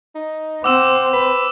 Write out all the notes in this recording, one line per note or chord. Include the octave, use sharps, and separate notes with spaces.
D#4
C4 F#5 D6 E6 E7
B4